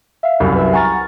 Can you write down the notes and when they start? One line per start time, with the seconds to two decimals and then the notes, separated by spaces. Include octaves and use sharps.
0.23 E5 F5
0.40 C2 F#2
0.56 B4 E5
0.73 F#5 G#5 A#5 C#6 F6 A6